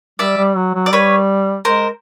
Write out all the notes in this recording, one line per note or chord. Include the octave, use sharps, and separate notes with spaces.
G3 D5 E5
G3
F#3
F#3
D5
G3 B4 C#5
G#3 A#4 C5